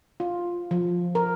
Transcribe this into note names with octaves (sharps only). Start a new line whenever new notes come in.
F4
F3
A#4